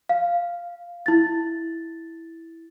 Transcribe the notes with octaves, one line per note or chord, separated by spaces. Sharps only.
F5
E4 A6